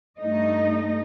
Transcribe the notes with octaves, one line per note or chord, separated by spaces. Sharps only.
G2 A3 D#4 D#5